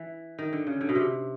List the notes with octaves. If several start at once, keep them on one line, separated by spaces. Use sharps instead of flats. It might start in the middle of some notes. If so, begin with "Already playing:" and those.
Already playing: E3
D#3
D3
C#3
D3
B2
C3